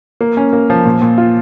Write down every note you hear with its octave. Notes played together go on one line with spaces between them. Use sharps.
A#3
C#4
A#3
F3
A#2
A#2
F4